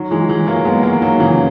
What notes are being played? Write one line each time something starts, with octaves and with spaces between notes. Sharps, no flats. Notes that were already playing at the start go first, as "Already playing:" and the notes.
Already playing: D#3 F#3
E3 G#3
E3 G#3
F#3 A#3
G#3 B3
F#3 A#3
D#3 F#3
C#3 E3